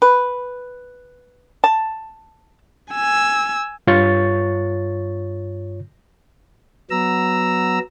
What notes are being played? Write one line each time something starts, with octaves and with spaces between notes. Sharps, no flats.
B4
A5
G#5 E6
G2 F4 C#5 C#6 A6
F#3 B3 A#5 E6